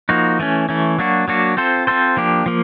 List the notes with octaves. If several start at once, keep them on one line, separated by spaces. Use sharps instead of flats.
F3 A#3 D#4 F#4
E3 A3 C#4
E3 A3 C#4
F#3 A#3 D4 F#4
F#3 A#3 D4 F#4
C4 F4 A4 C5
C4 F4 A4 C5
F3 A#3 D4 G4
F3 A#3